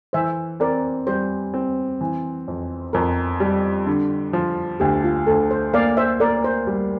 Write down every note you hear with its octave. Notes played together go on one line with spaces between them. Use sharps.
E3 C5 E5
C4 A#4 D5
G3 C5
C4
E3
F2
F2 A#4
G3
D3
F3
D2 G4
F4
D2 A4
C5
A#3 D5 F5
C5 E5
A#3 A#4 D5
C5
G3